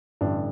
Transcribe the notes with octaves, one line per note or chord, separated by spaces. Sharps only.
A1 G2 D3 D4